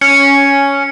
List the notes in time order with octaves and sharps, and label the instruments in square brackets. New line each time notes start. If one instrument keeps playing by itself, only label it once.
[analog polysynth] C#4 [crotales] C#7